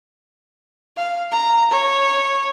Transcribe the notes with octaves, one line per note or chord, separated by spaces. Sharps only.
F5
A#5
C#5